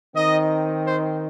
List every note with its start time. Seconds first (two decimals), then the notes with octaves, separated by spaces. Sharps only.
0.15 D#3 C4 D#4 D#5
0.86 C5